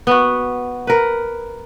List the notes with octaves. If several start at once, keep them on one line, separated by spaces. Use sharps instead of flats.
B3 F#4
A#4 B4